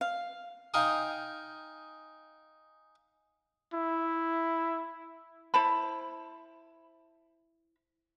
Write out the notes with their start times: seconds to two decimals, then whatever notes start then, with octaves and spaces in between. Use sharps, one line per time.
0.01 F5
0.74 D#4 F5 G5 G#5 D#6
3.73 E4
5.54 E4 C5 A5 B5